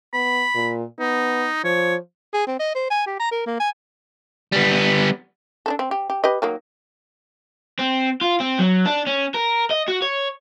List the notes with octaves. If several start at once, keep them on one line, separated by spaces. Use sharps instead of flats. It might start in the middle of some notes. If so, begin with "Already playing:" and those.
B3 B5
A#2
B3 D#4
F3 C#5
G#4
C4
D#5
C5
G#5
G4
A#5
A#4
A#3
G#5
G3 B3
D4 E4 A4
C4
G4
G4
G4 B4 D#5
D#3 F#3 A#3
C4
F4
C4
F#3
D4
C#4
A#4
D#5
F#4
C#5